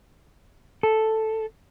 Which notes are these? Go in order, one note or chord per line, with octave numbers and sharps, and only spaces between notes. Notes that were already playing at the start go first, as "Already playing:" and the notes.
A4